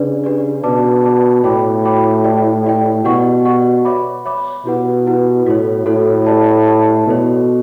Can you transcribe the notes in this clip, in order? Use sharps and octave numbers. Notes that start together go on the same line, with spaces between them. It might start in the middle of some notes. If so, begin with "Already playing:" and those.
Already playing: C#3 D4 G4 B4 D5
D4 G4 B4 D5
B2 B4 D5 A5 D6
B4 D5 A5 D6
A2 F#4 C#5 G5 B5 D6
F#4 C#5 G5 B5 D6
G4 D5 G5
G4 D5 G5
B2 G4 D5 F#5 C#6
G4 D5 F#5 C#6
C#5 E5 B5 D6
C#5 E5 B5 D6
B2 E4 G4 B4 F#5
E4 G4 B4 F#5
A2 F#4 A4 C#5
A2 F#4 A4 C#5
G4 D5 A5
G4 D5 A5
B2 F#4 A4 C#5